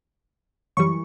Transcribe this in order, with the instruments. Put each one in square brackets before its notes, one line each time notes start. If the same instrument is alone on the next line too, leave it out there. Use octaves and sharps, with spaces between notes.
[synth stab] F#2 E3 G3 C#6